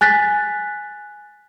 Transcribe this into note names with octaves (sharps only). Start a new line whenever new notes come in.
G#5 F#6 A6 B6